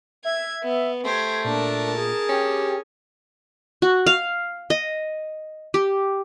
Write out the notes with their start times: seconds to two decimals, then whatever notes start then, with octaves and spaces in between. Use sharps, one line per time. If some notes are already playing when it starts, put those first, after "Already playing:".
0.25 E5 G#6
0.63 B3
1.05 A3 G4 C5 G#6
1.45 A#2 D4 A#4 A5
1.97 G#4
2.29 C#4 G4
3.82 F#4
4.06 F5
4.70 D#5
5.74 G4